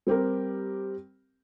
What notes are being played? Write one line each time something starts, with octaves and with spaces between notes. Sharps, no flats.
G3 C4 G4 A#4